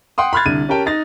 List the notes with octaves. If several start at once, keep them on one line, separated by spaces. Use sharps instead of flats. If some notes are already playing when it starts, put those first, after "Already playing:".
F#5 G5 C6 D#6
B5 C6 F6 F#6 G#6 A6
C2 D3 D#7
C#4 G4 A#4 G5 A5
D#4 A6 A#6